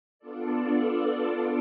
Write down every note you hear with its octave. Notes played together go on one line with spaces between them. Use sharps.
B3 D4 F4 A4 D5